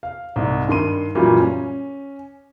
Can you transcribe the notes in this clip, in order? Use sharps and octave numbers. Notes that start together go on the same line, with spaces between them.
F5
C2 G#2
G2 D#3 C6 D#7
F#2 A#2 E3 F#3 G3
C#4